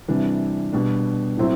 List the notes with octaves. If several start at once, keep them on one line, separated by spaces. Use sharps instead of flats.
C3 E3 G3 D4
B2 G3 D4
A2 F#3 C4 E4